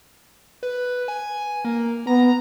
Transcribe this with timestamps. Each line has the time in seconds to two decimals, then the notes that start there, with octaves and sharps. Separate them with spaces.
0.63 B4
1.08 G#5
1.65 A#3
2.07 B3 A#5